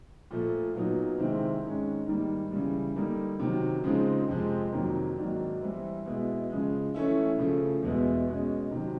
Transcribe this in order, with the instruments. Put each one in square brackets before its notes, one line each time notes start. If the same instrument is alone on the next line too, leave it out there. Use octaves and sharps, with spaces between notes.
[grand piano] A#2 F3 A3
A#2 F#3 B3 D#4
C3 D#3 G#3 C4 E4
G#2 D#3 G#3 C#4
G#2 D#3 G3 A#3
C#3 E3 G3
D3 G3 A#3 D#4
C3 D#3 F#3
C#3 F3 G#3 C4 D#4
F2 C3 F3 G#3 C4
F2 C3 D#3 F#3 A#3
G#2 D#3 F#3 A#3 D4
E3 G3 C4 E4
B2 G#3 B3 E4
C#3 F3 G#3
E3 A3 C#4 E4
C#3 F3 A3
E2 B2 G#3 B3 E4
B2 G#3 C#4
C3 D#3 F#3